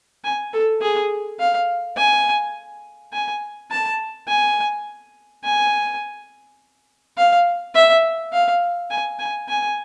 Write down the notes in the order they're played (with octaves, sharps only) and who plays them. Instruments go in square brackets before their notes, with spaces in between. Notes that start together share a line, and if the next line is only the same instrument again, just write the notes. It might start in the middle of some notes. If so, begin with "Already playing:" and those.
[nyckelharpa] G#5
A4
G#4
F5
G#5
G#5
A5
G#5
G#5
F5
E5
F5
G#5
G#5
G#5